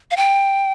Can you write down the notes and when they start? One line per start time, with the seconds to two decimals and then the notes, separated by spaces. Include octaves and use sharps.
0.11 F5
0.17 G5